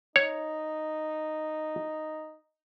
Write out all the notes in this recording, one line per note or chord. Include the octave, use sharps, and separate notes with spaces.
D#4 C#5